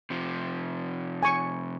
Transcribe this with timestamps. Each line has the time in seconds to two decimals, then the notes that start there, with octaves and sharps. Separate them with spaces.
0.10 C3 F3
1.23 G#5 C#6